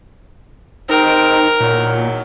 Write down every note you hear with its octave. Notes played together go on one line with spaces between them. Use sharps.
C3 G#3 C4 D#4 A#4
E2 A#2 D#3 F#3